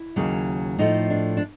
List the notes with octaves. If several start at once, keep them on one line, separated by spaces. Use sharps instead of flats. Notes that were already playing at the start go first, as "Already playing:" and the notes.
Already playing: E4
D#2 C#3 F#3 A#3
A2 F3 A3 D#4
D4
D4